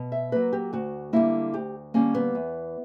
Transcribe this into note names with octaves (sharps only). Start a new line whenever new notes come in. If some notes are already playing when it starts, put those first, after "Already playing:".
Already playing: B2
E5
F#3 A#3 B4
G4
D2 F#4
D3 G3 A#3 E4
D2 G4
D3 G3 A#3 C#4
B3
E2